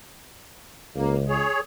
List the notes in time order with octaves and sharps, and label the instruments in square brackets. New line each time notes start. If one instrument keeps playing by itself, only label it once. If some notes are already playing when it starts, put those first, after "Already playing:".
[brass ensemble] C#2 [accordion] A#3
[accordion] G#4 C#5